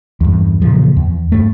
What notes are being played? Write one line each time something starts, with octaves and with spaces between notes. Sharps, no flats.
E2 G2
A#2 C#3 E3 F3
E2
G2 A3